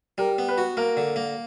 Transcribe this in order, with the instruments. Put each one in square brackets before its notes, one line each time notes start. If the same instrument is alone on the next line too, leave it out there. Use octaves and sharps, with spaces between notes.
[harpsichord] G3 [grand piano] A#4
[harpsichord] B3
[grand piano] B4
[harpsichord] F#4
[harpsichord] A#3 [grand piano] A#4
[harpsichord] D3
A#3